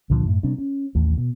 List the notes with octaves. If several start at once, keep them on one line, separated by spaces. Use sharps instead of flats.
C#2 A#2 D3 F3
F#2 A2
C3 G3 C4 D4
C#4
A1 D#2 A2
B2